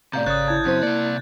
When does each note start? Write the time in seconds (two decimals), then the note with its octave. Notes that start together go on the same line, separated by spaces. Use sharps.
0.13 A2 C3 D5 F5 A#5 G6
0.26 G#1 C#3 C#5 D#6 F#6 A6
0.48 E4 A5 G#6
0.65 F#2 C#3 C4 C5
0.83 C3 A#3 D5